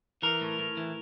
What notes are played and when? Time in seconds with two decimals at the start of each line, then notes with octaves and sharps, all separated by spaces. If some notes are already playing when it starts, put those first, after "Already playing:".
0.22 E3 A#4
0.41 A2
0.59 A2
0.77 E3